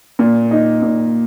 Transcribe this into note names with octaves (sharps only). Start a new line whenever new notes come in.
A#2
D#4
A#2